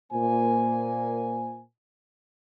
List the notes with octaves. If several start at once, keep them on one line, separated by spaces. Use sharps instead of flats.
A#2 A#3 C5 G#5